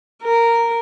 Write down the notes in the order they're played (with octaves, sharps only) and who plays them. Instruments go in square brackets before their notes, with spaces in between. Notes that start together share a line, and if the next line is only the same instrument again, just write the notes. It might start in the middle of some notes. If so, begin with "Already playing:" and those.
[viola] A#4